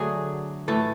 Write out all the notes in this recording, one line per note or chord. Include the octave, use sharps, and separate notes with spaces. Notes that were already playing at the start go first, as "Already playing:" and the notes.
Already playing: D3 F#3 A3 G#4
A2 E3 A3 A4